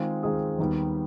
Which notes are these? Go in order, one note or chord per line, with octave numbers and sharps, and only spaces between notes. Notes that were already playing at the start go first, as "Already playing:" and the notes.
Already playing: D#3 G#3 C4 F4 G#4
D#3 G#3 C4 F4 G#4
D#2 D#3 G3 B3